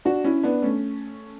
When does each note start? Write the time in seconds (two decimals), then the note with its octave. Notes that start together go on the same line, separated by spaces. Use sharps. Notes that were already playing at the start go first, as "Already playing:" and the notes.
0.05 D4 F#4
0.24 C#4 E4
0.43 B3 D4
0.63 A3 C#4